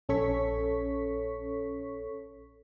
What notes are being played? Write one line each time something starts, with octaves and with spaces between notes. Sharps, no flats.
A#1 C#4 A4 C#5 C#6 B6